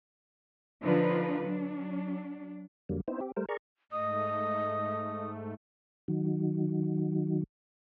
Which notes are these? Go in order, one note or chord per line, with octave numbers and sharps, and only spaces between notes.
D3 F3 D4 D#4 F4 B4
F#3 D4
F2 D3 F#3 G3 A#3
B3 C4 D#4 E4 C5
C4 G4
G3 A3 A#4 C5
G#4 A#4 D5 A#5 C#6
G#2 A3 D#5 D#6
D#3 F#3